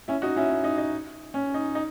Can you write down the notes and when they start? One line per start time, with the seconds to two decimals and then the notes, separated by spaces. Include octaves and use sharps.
0.08 C#4 E4
0.22 D#4 F#4
0.36 C#4 E4
0.50 C#4
0.64 D#4
0.78 D#4
1.34 C#4
1.54 D#4
1.75 D#4